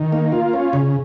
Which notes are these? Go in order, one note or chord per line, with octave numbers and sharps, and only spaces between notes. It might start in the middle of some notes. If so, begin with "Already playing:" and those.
Already playing: D#3
A#3
F4
C#4
C#3